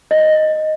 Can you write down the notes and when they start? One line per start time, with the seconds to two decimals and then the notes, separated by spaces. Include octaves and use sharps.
0.11 D#5